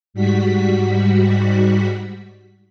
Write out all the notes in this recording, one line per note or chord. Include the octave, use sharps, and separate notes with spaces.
G#2 G3 F#4 B6